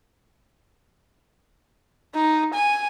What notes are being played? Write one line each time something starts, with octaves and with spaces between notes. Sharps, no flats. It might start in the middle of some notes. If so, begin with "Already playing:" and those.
D#4
G#5